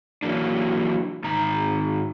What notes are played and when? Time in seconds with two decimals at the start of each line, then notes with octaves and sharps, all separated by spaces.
0.23 E3 F#3 A#3 D4
1.24 G#2 D#3 A#5